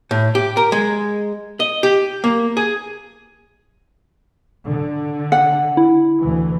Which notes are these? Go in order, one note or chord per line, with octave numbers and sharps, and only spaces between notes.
A2
G4
A#4
G#3
D#5
G4
A#3
G#4
D3
F#5
E4
D2 E3